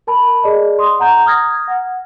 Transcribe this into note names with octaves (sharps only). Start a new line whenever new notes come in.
A#4 A5 B5
G#4 D5 D#5
C6 D#6
F#5 A#5 G6
D#6 F6 G#6 A#6
F#5